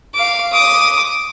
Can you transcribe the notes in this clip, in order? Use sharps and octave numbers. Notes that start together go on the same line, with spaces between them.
F5 D6
D6 D#6